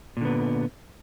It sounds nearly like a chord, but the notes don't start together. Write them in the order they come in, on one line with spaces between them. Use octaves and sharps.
A#2 D3 B3